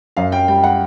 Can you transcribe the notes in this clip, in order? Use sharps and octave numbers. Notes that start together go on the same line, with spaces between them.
F#2 F5
G5
G3 G5
F#5